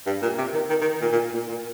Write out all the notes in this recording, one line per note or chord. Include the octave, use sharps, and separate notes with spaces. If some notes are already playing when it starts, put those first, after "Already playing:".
G2
A#2
C3
D#3
D#3
D#3
A#2
A#2
A#2
A#2